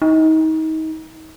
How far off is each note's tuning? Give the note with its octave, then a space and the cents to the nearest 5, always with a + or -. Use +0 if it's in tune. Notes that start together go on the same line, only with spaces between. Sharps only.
D#4 +30